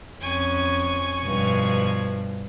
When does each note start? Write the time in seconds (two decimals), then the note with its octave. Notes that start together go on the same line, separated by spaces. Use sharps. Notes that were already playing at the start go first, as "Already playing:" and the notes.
0.21 F2 C#4 G#5 C#6
1.24 G2 B2 F3